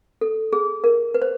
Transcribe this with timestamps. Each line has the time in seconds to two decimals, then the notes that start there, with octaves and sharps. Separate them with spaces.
0.21 A4
0.53 G#4
0.84 A#4
1.14 B4
1.22 C5